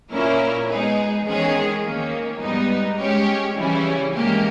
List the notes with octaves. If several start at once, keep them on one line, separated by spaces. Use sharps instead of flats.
A#2 A#3 C#4 E4 A#4
G#3 B3 D#4 G#4
E2 D#3 G#3 C#4 G#4
D#3 A#3 C#4
G#2 G3 B3 D#4
G#3 C#4 G4 C#5
C#3 E3 G3 C#4 E4
G#2 E3 A#3 C#4 G4